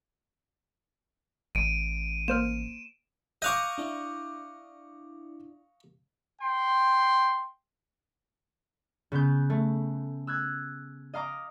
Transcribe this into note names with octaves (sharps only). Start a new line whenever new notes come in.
A1 D7 D#7
A#3 C5 F6 E7
D#5 F5 C#6 D6 F#6 G6
D4 E4 D5
G5 C6
C#3 B3 B4 G6
A3
E6 F#6 G#6
D#5 F5 A#5 D6 D#6